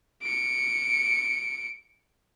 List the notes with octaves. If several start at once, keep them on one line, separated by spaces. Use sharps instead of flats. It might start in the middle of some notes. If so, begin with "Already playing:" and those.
C#7 D7